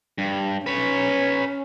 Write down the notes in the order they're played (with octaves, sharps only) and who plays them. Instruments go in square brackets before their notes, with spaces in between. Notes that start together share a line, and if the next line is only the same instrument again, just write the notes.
[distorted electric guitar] G2
[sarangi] C#4 [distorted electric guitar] B4 C#5